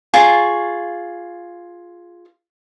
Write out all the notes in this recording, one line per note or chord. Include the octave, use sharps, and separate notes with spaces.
F4 G#4 C#6